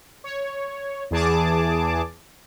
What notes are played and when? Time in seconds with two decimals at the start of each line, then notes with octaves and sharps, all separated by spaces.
0.24 C#5
1.11 E2 E3 G#4 A5 D6